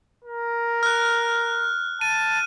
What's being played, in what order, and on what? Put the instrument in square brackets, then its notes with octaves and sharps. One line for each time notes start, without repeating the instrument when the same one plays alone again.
[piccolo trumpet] A#4
[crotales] F6 F#6
[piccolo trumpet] A5 [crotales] D#7